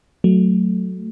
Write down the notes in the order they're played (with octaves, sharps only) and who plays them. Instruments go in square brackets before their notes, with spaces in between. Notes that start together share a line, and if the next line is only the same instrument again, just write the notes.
[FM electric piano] F#3 A3